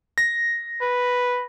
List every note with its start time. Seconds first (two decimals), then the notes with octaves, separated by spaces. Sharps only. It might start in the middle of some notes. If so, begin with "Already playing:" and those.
0.18 A#6
0.82 B4